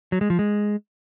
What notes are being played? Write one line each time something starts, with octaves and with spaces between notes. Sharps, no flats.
F#3
G#3
F3
G#3